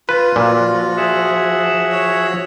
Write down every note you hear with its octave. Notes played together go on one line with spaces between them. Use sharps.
F4 B4
A#2 F3 F#4
G#4 E5 F#5
C#5